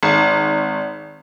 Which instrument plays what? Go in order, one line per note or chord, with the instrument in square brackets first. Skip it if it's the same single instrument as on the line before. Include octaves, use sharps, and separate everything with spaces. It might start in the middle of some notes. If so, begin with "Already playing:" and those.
[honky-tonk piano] G#1